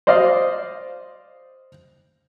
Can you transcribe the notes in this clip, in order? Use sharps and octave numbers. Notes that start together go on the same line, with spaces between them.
C5 D5 D#5 F5